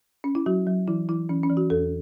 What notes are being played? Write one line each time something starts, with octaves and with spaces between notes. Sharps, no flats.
C#4
E4
F#3 F#4
F#3
E3 E4
E3 E4
E3 C#4
C#4
E3
F#4
E2 A4